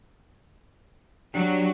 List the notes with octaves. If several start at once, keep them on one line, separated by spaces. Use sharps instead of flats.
F#3 D4 G4